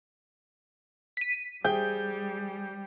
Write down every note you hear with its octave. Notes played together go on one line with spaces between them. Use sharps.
B6 D#7
G3 G#4 G5